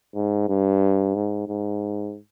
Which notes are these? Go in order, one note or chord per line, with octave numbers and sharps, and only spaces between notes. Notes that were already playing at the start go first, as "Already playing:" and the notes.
G#2
G2
G#2
G#2